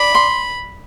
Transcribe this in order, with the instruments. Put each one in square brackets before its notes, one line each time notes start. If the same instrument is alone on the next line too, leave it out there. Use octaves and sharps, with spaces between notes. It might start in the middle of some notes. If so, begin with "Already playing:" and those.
Already playing: [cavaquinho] D5 [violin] B5
[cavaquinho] C6